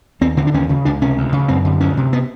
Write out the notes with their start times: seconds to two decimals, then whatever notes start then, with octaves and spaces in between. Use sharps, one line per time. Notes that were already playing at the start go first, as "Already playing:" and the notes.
0.21 D#2 C4
0.37 D3 C4
0.47 D4
0.54 D#2 C#4
0.69 C#3
0.85 C#2 D4
1.01 C3 C#4
1.18 D2
1.32 C#3
1.48 F#2 C4
1.65 D3
1.80 D2 C#4
1.97 C3
2.13 B3